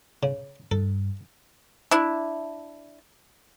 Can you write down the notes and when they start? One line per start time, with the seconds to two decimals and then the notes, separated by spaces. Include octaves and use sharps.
0.23 C#3
0.71 G2 A4
1.91 D4 E4